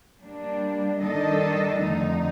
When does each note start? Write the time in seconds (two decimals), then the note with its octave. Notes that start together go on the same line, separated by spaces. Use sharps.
0.20 G3 A#3 D4
0.99 D#3 G3 D4 A4 D#5
1.78 F2 D3 A3 D#4